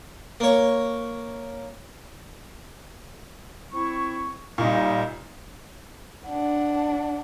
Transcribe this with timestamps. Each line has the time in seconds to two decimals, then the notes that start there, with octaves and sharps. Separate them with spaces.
0.40 A#3 C#5
3.72 C4 E4 C#6
4.58 A#2 G3 D#4
6.26 D4 F#5